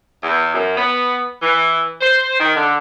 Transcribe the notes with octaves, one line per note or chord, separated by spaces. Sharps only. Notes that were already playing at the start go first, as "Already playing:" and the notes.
E2
F#2
B3
E3
C5
D#3
D3